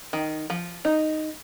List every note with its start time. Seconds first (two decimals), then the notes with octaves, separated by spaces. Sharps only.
0.13 D#3
0.50 F3
0.85 D#4